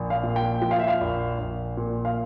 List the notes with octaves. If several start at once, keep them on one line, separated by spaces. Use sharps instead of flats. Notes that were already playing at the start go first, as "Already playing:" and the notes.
Already playing: A#1
F5
A#2
G5
F3 G5
F5
E5
F5
A#1
A#1
A#2
F5